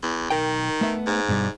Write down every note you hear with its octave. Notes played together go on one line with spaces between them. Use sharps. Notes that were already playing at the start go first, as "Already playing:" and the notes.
E2
B1 D#3 A#4 G5
A3 B3 E5
G#2
G2 B2 G3